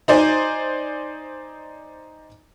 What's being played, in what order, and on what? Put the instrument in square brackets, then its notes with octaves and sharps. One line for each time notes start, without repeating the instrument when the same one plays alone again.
[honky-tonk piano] D#4 C5 D5 G#5